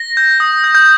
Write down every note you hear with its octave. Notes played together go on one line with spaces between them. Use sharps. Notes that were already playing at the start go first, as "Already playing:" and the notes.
Already playing: A#6
G6
D#6
G6
G6